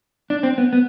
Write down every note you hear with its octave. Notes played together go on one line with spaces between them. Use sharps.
D4
C4
B3
B3